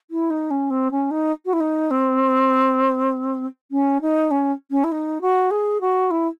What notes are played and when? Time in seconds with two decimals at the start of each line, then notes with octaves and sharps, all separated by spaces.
0.10 E4
0.30 D#4
0.50 C#4
0.70 C4
0.91 C#4
1.10 D#4
1.45 F#4
1.53 E4
1.60 D#4
1.90 C4
3.71 C#4
4.01 D#4
4.31 C#4
4.71 C#4
4.84 E4
4.91 D#4
5.21 F#4
5.50 G#4
5.80 F#4
6.10 E4